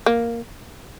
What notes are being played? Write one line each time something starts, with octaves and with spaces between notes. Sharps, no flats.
A#3